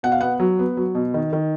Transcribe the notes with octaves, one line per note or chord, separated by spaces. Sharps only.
B2 F#5
F5
B3 F#5
F#3
B3
F#3
B2
D#3
D#3